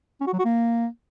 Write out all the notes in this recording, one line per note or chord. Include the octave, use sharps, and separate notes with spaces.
C#4
F#4
F#3
F#4
A#3